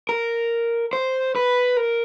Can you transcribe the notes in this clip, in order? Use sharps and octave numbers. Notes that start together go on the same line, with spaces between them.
A#4
C5
B4
A#4